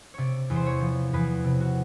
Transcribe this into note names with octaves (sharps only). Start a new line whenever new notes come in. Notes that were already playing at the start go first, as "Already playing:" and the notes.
C3 C#5 D5
E2
C5
C#5
F3
E2 B4
C3
F#4